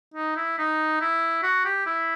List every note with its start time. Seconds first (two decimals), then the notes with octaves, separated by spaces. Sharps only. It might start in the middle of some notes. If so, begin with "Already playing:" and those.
0.14 D#4
0.37 E4
0.58 D#4
1.01 E4
1.43 F#4
1.65 G4
1.86 E4